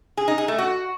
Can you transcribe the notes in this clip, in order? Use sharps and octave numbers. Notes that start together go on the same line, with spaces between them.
G#4
D#4
G#4
A3
F#4